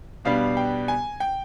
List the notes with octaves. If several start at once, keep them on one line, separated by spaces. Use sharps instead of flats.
B2 G3 B3 D4 F5
G5
G#5
G5